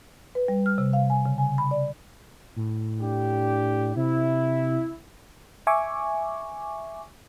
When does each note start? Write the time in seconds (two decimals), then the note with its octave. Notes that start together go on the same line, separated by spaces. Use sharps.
0.35 B4
0.48 G3
0.66 F6
0.78 C3
0.93 F5
1.10 G#5
1.26 C#3
1.38 G#5
1.58 B5
1.71 D5
2.56 A2
3.01 D4 G4
3.96 C3 E4
5.67 E5 G#5 C#6 D6